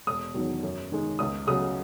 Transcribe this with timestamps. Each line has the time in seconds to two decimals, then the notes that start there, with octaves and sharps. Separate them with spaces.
0.06 E1 D#6
0.34 E2 D#3 F#3
0.63 F#2
0.92 D#3 G#3
1.19 C#2 D#6
1.47 C#3 F#3 D#6